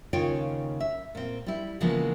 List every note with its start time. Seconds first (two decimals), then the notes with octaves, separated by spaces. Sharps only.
0.13 D#2 C#3 D#4 F4 C#5 G5
0.80 E5
1.15 A#2 C4
1.47 G3 E4
1.80 C#3 E3 F3 G#3 A#3 B3